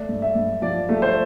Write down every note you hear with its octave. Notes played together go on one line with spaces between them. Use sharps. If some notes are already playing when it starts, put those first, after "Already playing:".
Already playing: A3 D5
G2
E5
G2
F3 D5
A3
C5